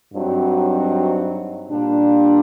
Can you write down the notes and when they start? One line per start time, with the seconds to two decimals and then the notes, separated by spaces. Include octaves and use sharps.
0.14 G2 F#3 C4 D#4
1.69 A#2 G3 D4